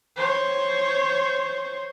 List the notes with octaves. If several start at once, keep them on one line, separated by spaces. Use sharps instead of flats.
C5 C#5